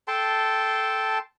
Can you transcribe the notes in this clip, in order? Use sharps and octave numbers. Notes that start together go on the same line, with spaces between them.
A4 G5 A5 C6